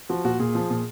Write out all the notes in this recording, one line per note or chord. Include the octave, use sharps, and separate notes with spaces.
F3 F#4
A#2 F#4
A#2 G#4
F3
A#2